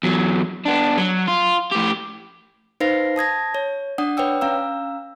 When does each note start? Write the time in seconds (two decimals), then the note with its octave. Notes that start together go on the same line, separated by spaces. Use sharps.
0.03 E2 F#3
0.65 B3 D4
0.98 F#3
1.28 F4
1.72 A2 G4
2.80 D#4 B4 C5 F5 A#6 C7
3.16 A5 D#6 G#6 A#6
3.55 C#5
3.98 D4 D5 F#5 D#6
4.17 B4 C#5 D5 G5 E6
4.41 C#4 F5 A#5 E6